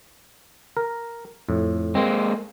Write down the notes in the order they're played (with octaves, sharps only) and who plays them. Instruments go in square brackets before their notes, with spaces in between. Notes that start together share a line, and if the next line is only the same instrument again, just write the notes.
[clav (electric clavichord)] A#4
F2 A2
[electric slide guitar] G#3 A#3 [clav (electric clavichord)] C4